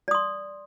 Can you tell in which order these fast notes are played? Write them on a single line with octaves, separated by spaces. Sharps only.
D5 D#6 C6